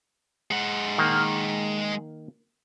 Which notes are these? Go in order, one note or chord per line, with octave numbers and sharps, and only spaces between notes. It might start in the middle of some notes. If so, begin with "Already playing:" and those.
G#3 F#5
D#3 A#3 D#4